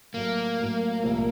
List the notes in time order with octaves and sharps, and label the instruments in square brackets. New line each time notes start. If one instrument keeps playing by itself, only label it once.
[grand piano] A2 F#3 A3 [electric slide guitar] A#3
[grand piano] A2 F#3 A3
C2 A#2 F3 A3